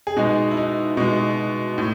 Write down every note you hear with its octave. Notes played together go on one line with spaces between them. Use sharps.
G#4
B2 G#3 D#4 F#4
E4
D#4
B2 G#3
A2